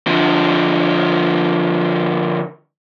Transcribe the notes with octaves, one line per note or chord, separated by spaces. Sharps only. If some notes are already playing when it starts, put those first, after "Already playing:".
D3 F3